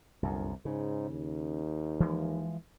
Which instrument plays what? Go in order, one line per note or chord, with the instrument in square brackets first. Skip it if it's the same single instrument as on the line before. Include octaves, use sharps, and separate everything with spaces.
[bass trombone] G1 [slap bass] C2 F#2
[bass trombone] G#2 [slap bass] C#3
[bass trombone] D#2
[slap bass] E3 F3 G#3